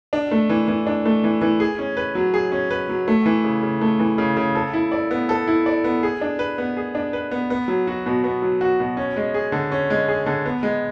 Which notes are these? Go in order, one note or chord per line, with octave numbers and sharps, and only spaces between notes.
D4
A3
E3
E3
D4
A3
E3
E3
G#4
C#4
B4
F#3
G#4
C#4
B4
F#3
A3
E3
C#3
C#3
A3
E3
C#3
C#3
A4
E4
D5
B3
A4
E4
D5
B3
G#4
D4
B4
B3
G#4
D4
B4
B3
B3
F#3
F#4
B2
B3
F#3
F#4
B2
C#4
G#3
G#4
D3
C#4
G#3
G#4
D3
B3
G#3